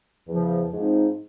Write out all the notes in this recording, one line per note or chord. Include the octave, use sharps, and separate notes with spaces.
E2 C#3 F3
G#2 F3 G#3 C4 D#4